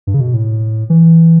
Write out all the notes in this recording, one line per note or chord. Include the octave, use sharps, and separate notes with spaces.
G2
C#3
B2
A2
E3